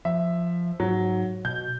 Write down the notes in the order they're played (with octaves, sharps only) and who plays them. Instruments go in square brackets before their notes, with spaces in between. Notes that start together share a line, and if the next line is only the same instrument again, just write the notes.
[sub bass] F3 [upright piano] E5
[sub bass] G#2 [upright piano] F#3
[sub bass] B2 [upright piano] G6